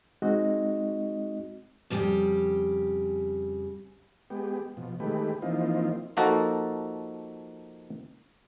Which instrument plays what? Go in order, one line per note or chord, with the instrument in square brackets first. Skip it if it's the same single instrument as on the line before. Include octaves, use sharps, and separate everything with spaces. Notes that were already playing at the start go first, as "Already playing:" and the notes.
[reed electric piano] G#3 C4 D#4 F#4 D#5
[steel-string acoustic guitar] F2 C#3 G3 G4
[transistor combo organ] G#3 B3 G4
B2 F3
D#3 G#3 A3 G4 B4
E3 F3 A#3 C4 D#4 F4
[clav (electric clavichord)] F3 A#3 D#4 F#4 A4